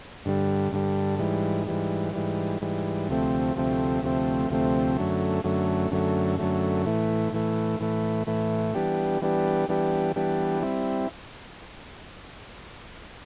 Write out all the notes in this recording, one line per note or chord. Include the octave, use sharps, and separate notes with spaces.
G2 D3 G3
G2 D3 G3
G#2 E3 G3
G#2 E3 G3
G#2 E3 G3
G#2 E3 G3
D2 C3 F3 A3 C4
D2 C3 F3 A3 C4
D2 C3 F3 A3 C4
D2 C3 F3 A3 C4
F#2 D3 F#3 A3
F#2 D3 F#3 A3
F#2 D3 F#3 A3
F#2 D3 F#3 A3
A2 E3 A3
A2 E3 A3
A2 E3 A3
A2 E3 A3
E3 G3 B3 D4 G4
E3 G3 B3 D4 G4
E3 G3 B3 D4 G4
E3 G3 B3 D4 G4
G3 C4 E4